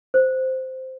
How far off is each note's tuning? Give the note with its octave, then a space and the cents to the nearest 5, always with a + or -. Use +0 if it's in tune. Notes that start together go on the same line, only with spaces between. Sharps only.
C5 -10